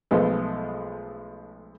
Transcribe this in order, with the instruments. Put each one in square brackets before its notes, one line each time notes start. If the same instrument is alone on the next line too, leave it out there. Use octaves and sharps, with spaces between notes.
[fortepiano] B1 F3 G#3 A3 B3